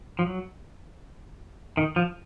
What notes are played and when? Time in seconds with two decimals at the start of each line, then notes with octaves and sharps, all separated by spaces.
0.19 F3
0.26 F#3
1.77 D#3
1.96 F3